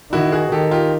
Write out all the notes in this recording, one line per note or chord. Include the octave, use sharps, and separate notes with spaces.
D#3 E4 F#4
F#4 G#4
D#3 G4 A4
F4 G4